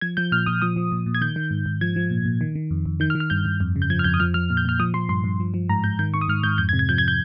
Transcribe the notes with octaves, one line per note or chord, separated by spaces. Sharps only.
F3 G#6
F3 G6
A#2 F6
A#2 D#6
F3 D#6
F3
A#2
A#2
G#6
D#3 G6
D#3
G#2
G#2
F3 G#6
F3
A#2
A#2
D#3
D#3
F2
F2
D#3 G6
F6
D#3
F6
G2 G6
G2
F2
C#3
G6
F3 G#6
F6
F2 G6
D#6
F3 F6
F3 F6
A#2
G6
A#2 F6
F3 D#6
F3 C6
G2 C6
G2
F3
F3
G#2 A#5
G#2 G6
D#3 G6
D#3 C#6
D#6
G#2 F6
G#2 G6
F2 G6
G#6
C3
G#6
F3 G6
G#6
G6